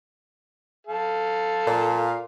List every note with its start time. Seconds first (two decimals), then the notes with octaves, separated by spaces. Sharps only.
0.87 A4 F5
1.67 A#2